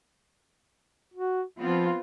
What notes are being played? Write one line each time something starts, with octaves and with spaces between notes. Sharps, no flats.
F#4
F3 B3 C4 F4